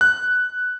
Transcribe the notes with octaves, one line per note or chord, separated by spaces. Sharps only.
F#6